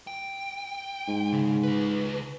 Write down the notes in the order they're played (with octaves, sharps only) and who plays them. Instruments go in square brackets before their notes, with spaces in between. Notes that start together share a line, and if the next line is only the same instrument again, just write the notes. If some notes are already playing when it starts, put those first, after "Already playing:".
[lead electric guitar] G5
[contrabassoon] G#2
[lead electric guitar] C#3
C#2 B4